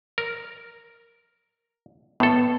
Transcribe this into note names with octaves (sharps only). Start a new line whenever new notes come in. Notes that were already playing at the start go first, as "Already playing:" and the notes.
A#4
A2 B3 A4